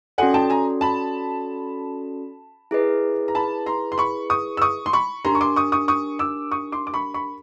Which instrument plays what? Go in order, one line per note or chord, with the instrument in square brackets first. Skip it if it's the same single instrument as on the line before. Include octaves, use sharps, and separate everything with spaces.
[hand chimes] C#4 F#4 A4 D5 [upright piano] F#5 G#5
[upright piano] G5 A5
G#5 A#5
A5 B5
[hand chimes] E4 G#4 B4 D#5
[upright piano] A#5
A5 B5
A#5 C6
C6
B5 C#6
C#6 D#6
E6
C#6 D#6
C6
B5 C#6
[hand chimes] D4 G4 A#4 [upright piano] A#5 C6
[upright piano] C#6
C6 D6
C#6 D#6
C#6 D#6
C#6 D#6
D6 E6
C#6 D#6
C6 D6
D6
B5 C#6
B5 C#6